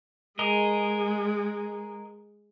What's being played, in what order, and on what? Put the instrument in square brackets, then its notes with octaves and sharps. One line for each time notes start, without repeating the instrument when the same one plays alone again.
[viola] G#3 [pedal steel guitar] G#4 A#4 D#5